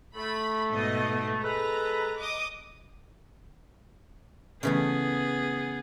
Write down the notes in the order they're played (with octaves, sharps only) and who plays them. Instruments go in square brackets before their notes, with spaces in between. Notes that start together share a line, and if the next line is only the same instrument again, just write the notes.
[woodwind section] A3 [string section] B5
[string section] G#2 B2 D#5
[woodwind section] G#3 A4 B4 [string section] A#5
[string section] D#5 D6 D#6
[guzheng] C#3 E3 A3 [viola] B3 G#4